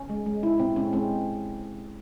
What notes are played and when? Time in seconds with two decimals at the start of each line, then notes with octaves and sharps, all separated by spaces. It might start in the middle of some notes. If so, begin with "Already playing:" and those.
Already playing: C#4
0.09 G#3
0.26 G#3
0.43 G#3 E4
0.60 A#2 C4
0.76 G#3 C#4
0.93 G#3 C4